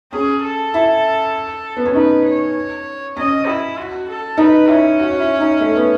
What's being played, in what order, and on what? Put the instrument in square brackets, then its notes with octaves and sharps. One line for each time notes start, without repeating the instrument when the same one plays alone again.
[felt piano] C#4 [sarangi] G#4
[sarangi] A4
[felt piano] E4
B3
C#4
[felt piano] D#4 [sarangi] B4
[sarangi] C#5
[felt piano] C#4 [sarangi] D#5
[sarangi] E4
F#4
A4
[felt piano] D#4 [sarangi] B4
[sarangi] C#4 [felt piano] E4
[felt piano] F#4
E4
D#4
A3
B3